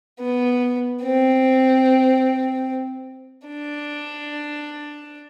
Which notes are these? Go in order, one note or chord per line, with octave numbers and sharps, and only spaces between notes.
B3
C4
D4